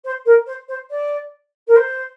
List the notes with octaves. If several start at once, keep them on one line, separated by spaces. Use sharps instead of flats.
C5
A#4
C5
C5
D5
A#4
C5